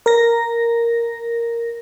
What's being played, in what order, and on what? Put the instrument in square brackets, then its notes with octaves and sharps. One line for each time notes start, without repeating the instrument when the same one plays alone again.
[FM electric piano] A#4 A#6